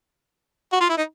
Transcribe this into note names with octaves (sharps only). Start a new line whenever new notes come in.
F#4
F4
E4
D#4